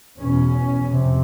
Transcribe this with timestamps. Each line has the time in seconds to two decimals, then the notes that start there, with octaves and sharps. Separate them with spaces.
0.19 E2 B2 C#4
0.88 F2 C3